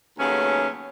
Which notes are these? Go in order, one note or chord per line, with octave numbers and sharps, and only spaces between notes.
D#2 C#3 F#3 A3 B3 C#4